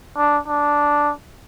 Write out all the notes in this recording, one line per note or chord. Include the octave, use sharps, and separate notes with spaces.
D4
D4